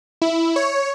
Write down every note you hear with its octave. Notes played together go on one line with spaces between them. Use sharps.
E4
C#5